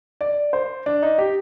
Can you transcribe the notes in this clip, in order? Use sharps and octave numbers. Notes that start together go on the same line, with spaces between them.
D5
C5
D4
D#4
G4